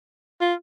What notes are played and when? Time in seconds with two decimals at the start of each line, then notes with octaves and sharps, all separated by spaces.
0.41 F4